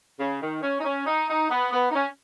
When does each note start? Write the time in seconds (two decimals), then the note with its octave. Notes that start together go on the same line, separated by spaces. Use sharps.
0.19 C#3
0.41 D#3
0.62 C#4
0.80 D#4
0.84 C#4
1.06 D#4
1.29 D#4
1.50 B3
1.72 B3
1.90 D#4
1.95 C#4